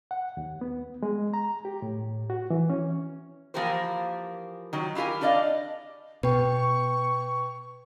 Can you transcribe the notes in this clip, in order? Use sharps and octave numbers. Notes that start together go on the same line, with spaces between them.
F#5
D#2
B3
G#3
A#5
G4
A2
F#4
E3
C#4
E3 F3 A#3 G4 A#4 C5
D#3 F#3
E4 F4 G4 A#4 G#5
D4 G4 D5 D#5 F5
B2 B4 G5 C#6